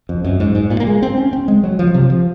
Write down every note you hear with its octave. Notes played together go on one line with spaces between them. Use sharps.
F2
F#2
G#2
G#2
A#2
A#3
G#3
C4
C#4
C4
G#3
F#3
F3
C3
F3